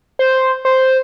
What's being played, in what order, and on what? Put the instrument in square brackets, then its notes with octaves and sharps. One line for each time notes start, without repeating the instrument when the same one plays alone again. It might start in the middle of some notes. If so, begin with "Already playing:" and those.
[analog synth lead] C5
C5